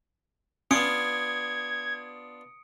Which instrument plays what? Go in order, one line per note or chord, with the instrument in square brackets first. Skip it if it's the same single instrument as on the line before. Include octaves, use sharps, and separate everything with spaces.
[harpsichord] B3 D4 F4 [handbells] C#4 [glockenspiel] D#6 C#7 D7 [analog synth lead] G#6